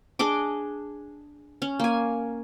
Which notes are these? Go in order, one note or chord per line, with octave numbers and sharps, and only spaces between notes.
D4 G#4 D#5 D6
C#4
A#3 G#5